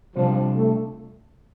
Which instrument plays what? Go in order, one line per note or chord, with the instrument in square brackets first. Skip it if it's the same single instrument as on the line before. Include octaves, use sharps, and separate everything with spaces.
[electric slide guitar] C3 G3 D4 F4 [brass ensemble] F3
[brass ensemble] A3